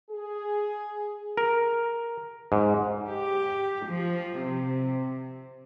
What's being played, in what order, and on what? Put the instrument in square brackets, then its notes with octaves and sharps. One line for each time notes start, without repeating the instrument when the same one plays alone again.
[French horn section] G#4
[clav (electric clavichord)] A#4
G#2
[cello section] G4
F3
C3